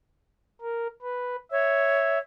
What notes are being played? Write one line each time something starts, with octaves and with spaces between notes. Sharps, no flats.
A#4
B4
C#5 E5